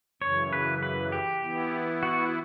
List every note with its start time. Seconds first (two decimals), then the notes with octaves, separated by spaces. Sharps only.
0.22 F#2 C#3 E3 C#5
0.53 B4
0.83 B4
1.12 G4
1.43 E3 B3 E4
2.03 F#4